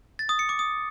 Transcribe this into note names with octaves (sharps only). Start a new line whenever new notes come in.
A6
D#6
C#7
D6
D#6